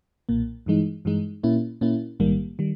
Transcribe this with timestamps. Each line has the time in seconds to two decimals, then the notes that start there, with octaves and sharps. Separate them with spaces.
0.29 B1 A#2 A#3
0.66 G2 E3 G#3 D#4
1.05 G2 E3 G#3 D#4
1.43 A#2 A#3 C#4 E4
1.81 A#2 A#3 C#4 E4
2.20 A#1 G#2 D#3 G3 A#3
2.59 D#3 G3